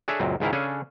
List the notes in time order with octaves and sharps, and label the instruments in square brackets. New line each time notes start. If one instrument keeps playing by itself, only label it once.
[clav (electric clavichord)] D4 G#4 A4 C#5 E5
C#2 F#2 A#2 C4
C#2 G#2 D#3 E4 F5
C#3 C#4 D4 G#4 A4 G#5